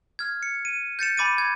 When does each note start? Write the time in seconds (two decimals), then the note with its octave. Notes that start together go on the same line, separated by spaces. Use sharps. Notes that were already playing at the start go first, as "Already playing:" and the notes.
0.19 F6 G#6
0.43 C#7
0.65 D#7
0.99 G6 A6 C#7 E7
1.17 G#5 B5 D6 A6 D#7
1.38 G#6